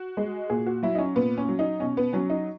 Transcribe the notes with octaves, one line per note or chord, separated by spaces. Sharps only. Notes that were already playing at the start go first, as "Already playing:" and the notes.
Already playing: F#4
G#3
A#2 G#4
F#4
F#3 E4
D#4
C#4
A#2 B3
C#4
F#3
D#4
B2 C#4
B3
F#3 C#4
D#4